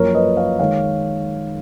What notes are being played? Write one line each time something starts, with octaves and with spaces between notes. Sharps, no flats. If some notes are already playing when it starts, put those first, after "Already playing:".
Already playing: F#2 F3 A#3 A#4 C#5
B4 D#5
C#5 F5
D#3 G#3 C#5 F5